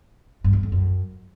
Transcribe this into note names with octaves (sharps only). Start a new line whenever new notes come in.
G2
F#2
F2
F#2